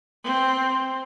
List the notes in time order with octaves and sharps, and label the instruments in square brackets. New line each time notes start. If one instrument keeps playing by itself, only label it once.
[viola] C4